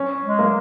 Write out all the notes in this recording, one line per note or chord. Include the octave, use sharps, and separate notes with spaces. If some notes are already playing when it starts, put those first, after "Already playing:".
Already playing: C#4
G#3
A#3